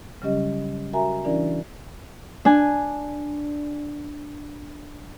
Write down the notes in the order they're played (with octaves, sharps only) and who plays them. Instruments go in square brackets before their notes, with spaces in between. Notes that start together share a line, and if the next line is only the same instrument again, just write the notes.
[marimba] C#3 F#3 G3 C#4 G4 D#5
F#4 A#4 E5 G#5 A#5
E3 C#4 D4 E4 A#4 D5
[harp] D4 G#5